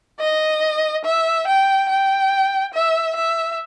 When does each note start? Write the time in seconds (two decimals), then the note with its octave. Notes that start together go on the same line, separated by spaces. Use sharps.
0.20 D#5
1.05 E5
1.47 G5
1.89 G5
2.74 E5
3.16 E5